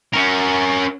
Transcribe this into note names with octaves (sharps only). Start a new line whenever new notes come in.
C#4 A#4